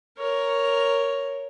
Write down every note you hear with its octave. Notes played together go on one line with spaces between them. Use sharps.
A#4 C#5